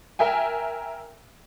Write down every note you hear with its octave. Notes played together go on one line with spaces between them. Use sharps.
A#4 E5 G5 G#5